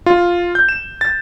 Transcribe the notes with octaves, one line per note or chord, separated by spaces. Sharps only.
F4
G6
E7
A6